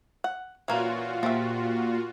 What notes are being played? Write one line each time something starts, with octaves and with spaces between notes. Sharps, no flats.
F#5
A#2 E3 A#3 C#4 F4 F#4
F3 A#3 G4 E5